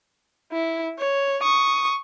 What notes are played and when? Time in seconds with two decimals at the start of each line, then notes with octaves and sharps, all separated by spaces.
0.52 E4
0.98 C#5
1.42 C#6 D#6